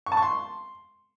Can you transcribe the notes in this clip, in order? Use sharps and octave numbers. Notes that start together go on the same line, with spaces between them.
C#6
A5
C#6
C6